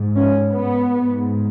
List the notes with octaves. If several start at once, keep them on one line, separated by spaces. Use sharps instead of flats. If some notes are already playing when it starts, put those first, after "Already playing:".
Already playing: G#2
C#4
B3
G#2